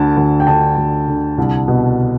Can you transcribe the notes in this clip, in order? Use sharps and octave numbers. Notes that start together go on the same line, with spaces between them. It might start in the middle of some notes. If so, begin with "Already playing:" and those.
Already playing: D2 D3 A5
D2
G5
D3 A5
D2
D3
C2
B2